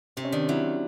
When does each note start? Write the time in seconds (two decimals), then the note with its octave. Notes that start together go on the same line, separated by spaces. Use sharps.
0.17 C3 C4
0.24 C#4
0.32 D#3 D4
0.49 F#3 E4